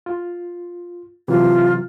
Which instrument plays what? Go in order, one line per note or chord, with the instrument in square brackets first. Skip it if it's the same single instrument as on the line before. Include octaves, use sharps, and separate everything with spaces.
[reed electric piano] F4
[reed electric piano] C3 E3 F#3 [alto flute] F4